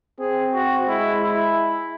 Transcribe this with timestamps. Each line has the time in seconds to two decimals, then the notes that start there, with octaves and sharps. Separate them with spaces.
0.20 C4 G#4
0.54 F#4
0.88 G#3 E4
1.22 E4